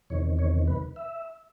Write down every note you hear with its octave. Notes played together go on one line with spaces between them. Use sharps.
E2 C3 D#3 C#5
C#5
B4
E5